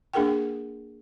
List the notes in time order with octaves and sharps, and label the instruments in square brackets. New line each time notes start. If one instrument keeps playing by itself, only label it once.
[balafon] A#3 D4 G#4 A#4 F#5 G5